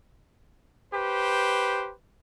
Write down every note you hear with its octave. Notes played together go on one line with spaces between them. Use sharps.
G4 B4 C5